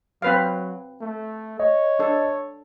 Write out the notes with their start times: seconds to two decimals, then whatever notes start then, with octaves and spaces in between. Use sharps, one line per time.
0.22 F#3 C4 B4 F5
1.01 A3
1.60 C#5 D#5
1.99 D4 A4